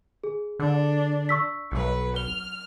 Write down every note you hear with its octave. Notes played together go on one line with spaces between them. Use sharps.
G#4
D3 D4
C#6 E6 B6
B1 F#3 B4
F6 G7